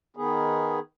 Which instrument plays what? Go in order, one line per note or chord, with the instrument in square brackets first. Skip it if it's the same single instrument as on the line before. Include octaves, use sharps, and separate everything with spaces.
[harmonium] D#3 B3 G#4